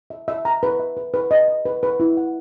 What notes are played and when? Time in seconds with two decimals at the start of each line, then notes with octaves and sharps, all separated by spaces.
0.10 E5
0.28 E5
0.45 A#5
0.63 B4
0.80 E5
0.97 B4
1.14 B4
1.31 D#5
1.48 D#5
1.65 B4
1.83 B4
2.00 E4
2.17 F#5